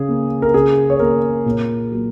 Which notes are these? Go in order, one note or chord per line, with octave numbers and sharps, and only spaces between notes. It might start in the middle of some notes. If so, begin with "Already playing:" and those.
Already playing: C#3 G#4
A#3
A#4
C#3 G#4
C#5
A#3 A#4
A#2
F#3 A#3